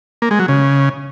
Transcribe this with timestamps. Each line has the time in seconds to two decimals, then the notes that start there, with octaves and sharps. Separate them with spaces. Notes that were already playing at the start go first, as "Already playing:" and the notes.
0.22 A#3
0.31 G#3
0.40 F#3
0.48 C#3